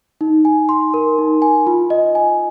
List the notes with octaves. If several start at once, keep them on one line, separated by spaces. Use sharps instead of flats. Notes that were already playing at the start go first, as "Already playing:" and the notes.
D#4
G#5
C6
A#4
D#4
G#5
F4
D#5
G#5